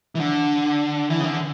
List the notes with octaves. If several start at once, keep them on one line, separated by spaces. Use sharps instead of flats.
E3
D3
E3
C#3
D3